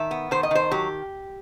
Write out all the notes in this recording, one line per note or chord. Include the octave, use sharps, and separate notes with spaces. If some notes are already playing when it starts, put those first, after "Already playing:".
Already playing: D#3 E5
B3
D#3 C5
D#5
D#3 C5
F#3 G4